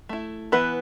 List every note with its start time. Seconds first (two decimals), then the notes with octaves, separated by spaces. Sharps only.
0.09 A3 E4
0.52 E3 B3 E4 B4